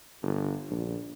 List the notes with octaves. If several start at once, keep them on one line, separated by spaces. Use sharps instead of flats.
G1
A#1